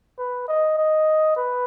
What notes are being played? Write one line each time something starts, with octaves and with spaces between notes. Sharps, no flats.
B4
D#5
D#5
B4